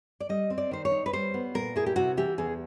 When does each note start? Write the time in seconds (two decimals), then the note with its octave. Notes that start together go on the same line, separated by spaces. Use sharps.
0.20 D5
0.29 G3 D#5
0.50 C4
0.58 D5
0.71 D#3 C5
0.85 C#5
0.92 D#4
1.06 B4
1.13 G3 C5
1.34 B3
1.54 A#2 A#4
1.76 E4 G#4
1.86 G4
1.96 C3 F#4
2.17 E3 G4
2.38 E2 G#4